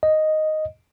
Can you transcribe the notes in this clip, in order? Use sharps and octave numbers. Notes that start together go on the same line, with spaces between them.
D#5